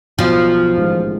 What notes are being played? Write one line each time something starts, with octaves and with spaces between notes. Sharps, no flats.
B1 B2 F3 F#3
A1 G#2 D#3 G#3